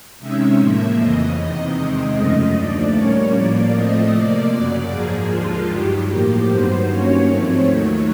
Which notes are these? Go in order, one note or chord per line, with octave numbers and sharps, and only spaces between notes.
C3 D#3 G#3 C#4 E5
A2 F3 A#3
F2 C#3 E3 D#5
E2 C3 D#3
E2 C3 D#3 G#3 C4 D#5
F#2 C#3 F3 A3
D#2 D3 F3 A3 D5
A#2 G3 A#3 C#4 C#5
A2 F3 A#3 D5
A2 F3 A3 C4 D#5
C3 F3 A#3 D5
F#2 C#3 F#3
G#2 F3 A#3 G#4
D#2 D3 F3 G#3 F4
G2 D#3 F#3 G4
A2 F3 A#3
G2 D#3 F#3 B3 C5
G2 D#3 F#3 A#3 C#4 C#5
G#2 F3 A3 C4 C#5
D#2 D#3 F#3 A3